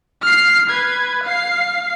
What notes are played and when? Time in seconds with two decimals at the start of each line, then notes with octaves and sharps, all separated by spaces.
0.23 F6 C7
0.70 B4 G#6
1.23 F5 C7